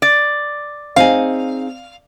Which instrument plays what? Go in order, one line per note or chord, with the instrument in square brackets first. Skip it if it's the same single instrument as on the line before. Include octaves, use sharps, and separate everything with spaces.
[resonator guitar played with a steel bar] D5
[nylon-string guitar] C4 D#4 G#4 [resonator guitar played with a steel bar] F5